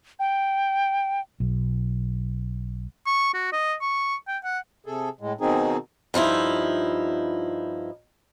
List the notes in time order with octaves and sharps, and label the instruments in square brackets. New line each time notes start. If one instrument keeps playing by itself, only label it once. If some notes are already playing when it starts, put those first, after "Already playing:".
[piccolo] G5
[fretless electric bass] B1
[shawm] C#6
F#4
D#5
C#6
G5
F#5
[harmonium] C3 G#4 A4
A2 G#3
B2 D#3 C4 D#4 G#4
[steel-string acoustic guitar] G2 F3 D#4 E4